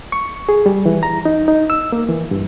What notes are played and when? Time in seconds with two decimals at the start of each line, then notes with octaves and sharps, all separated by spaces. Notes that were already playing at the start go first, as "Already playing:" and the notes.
0.12 C#6
0.49 G#4
0.66 G3
0.86 E3
1.03 A#5
1.25 D#4
1.48 D#4
1.70 E6
1.92 A#3
2.08 E3
2.31 G2